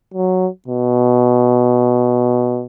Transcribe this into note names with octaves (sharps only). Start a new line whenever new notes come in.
F#3
B2